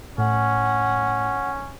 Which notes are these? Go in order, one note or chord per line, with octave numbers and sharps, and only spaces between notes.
A2 C#4 F#5